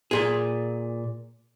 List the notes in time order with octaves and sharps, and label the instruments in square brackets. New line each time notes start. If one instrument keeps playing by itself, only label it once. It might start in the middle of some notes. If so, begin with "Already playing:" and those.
[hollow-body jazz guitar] A#2 G#4